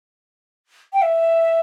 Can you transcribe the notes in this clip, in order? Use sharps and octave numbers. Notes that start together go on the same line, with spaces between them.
G5
E5